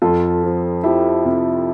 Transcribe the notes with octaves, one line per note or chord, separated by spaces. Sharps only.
F2 F4 A4
F3
F3 E4 G4
C3